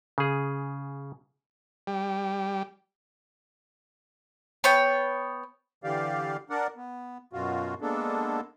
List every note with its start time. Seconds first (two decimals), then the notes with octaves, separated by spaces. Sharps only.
0.18 C#3 G#4
1.87 G3
4.64 B3 C#5 G5
5.84 D3 E3 G4 D5 F5
6.50 D4 A#4 D5 F#5
6.76 B3
7.33 F#2 B2 F4 F#4
7.81 G#3 A#3 B3 D4 A4